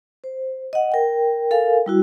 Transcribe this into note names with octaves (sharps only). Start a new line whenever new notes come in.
C5
D#5 F#5
A#4 G5
A4 A#4 F5 G#5
G3 E4 F#4